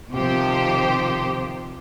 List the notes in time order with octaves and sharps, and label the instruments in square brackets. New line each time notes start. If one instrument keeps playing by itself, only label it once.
[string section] C3 D#3 F3 G4 C5